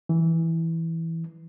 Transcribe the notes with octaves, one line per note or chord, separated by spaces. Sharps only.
E3